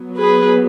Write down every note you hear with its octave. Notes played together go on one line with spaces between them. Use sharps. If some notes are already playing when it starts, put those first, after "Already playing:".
Already playing: F#3 B3
G#4 B4